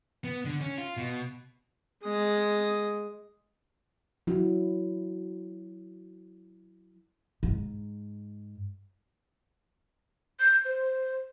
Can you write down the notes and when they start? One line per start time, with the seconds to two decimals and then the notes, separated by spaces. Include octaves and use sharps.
0.25 B3
0.45 D3
0.61 C#4
0.78 F4
0.97 B2
2.03 G#3 D#6
4.27 F#3 E4
7.43 G#2
10.40 G6
10.65 C5